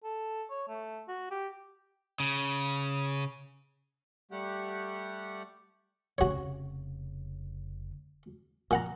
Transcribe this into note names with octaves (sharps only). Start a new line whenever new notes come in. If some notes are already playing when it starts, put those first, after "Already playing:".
A4
C#5
A3
F#4
G4
C#3
G3 A3 G4 F#5
F1 C#3 F#4 C#5
A#2 F3 F#5 A#5